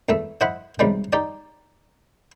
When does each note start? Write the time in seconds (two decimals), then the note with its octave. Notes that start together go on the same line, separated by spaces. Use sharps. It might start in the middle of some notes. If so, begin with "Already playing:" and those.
0.09 E2 A3 E5
0.41 E4 C5 D#5 F#5 B5
0.79 B1 C3 G3 G#3
1.13 D#4 G4 D5